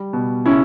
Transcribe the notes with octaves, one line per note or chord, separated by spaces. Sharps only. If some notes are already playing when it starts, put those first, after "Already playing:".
Already playing: G3
B2
C#3 C#4 E4